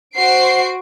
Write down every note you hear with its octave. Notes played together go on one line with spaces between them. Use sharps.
F#4 C5 C7 D7